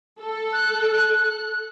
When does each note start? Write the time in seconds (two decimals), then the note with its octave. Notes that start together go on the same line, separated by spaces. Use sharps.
0.20 A4
0.53 F#6
0.91 F#6
1.28 F#6